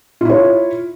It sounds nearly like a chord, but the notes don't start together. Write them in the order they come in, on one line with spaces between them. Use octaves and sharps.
F4 E4 C#5